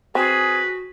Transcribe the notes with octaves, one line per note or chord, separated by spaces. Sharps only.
C4 F#4 G#4 B4